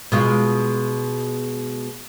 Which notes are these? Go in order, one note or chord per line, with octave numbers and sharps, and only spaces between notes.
B2 G#3 F4